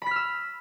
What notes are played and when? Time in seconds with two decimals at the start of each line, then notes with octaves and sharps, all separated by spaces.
0.02 B5
0.06 B6
0.11 F6
0.16 E6